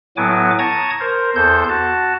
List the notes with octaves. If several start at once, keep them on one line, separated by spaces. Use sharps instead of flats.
A2 F#3 B3 G#5 D6
A5 A#5 C#6 D#6 G#6
A#4 C5
E2 A4 C5 G6
F#4 A5